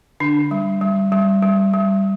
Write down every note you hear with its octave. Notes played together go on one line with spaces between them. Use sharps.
D3 D4
G3
G3
G3
G3
G3